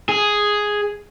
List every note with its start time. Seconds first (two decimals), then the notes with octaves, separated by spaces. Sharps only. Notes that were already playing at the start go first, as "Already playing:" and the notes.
0.09 G#4